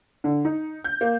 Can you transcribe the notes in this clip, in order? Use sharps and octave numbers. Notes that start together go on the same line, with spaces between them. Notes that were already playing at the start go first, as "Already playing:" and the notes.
D3
D#4
G6
A#3